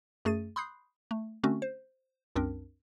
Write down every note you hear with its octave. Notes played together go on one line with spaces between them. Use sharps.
F#2 A3 G#4 A6 D#7
B5 C6 D#6 F#6 G6 C7
A3
D3 A3 C4 C#4 F#4
C5
C2 F#2 C4 D4 A#4